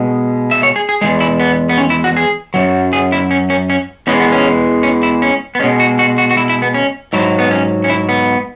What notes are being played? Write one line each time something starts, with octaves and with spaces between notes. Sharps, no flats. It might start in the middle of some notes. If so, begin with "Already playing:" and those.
Already playing: B2 G#3
E5
C#5
G#4
G#4
E2 E3 G#3 G#4
E4
B3
B3
C#4
E4
F#4
G#4
F#2 C#3 F#3
G#4
E4
C#4
C#4
C#4
E2 E3 G#3 C#4
B3
C#4
C#4
E4
C#4
B3
B2 G#3 C#4
F#4
F#4
F#4
F#4
E4
E4
B3
C#4
G#2 F#3 E4
B3
C#4
C#4
E4
B3